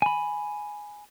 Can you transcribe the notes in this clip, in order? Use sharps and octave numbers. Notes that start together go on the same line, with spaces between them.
G#5 B5